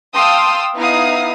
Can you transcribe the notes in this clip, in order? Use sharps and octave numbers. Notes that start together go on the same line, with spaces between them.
F5 G5 A5 C6 D#6 E6
B3 D#4 E4 F5 D#6